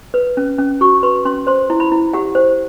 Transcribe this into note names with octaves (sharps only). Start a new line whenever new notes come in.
B4
C#4
C#4
F#4 C#6
B4 C6
C#4 C6
C5 C6
E4
B5
E4
G4 F#5
C5